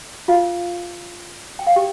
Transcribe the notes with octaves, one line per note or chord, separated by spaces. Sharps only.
F4 F5
G5
F5
G4 G5